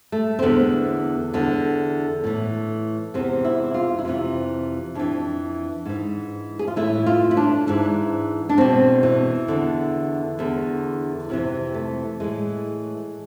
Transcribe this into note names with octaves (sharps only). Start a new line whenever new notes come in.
A3
C4
E2 D3 B3
E2 D3
A2 E3
E2 C3 E3 C4
E4
F4
E4
F2 C3 E3 F4
F2 E3 D4
G#2 E3
G#4
F4
A2 E3 E4
F4
E4
D4
G#2 E3 D4
D4
E2 B2 C4
E3
E2 D3
E2 D3
F2 C3 E3 F3
A3
A2 E3 G#3